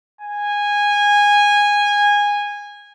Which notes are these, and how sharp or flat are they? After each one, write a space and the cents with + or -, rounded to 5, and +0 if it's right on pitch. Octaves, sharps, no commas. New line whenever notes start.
G#5 -15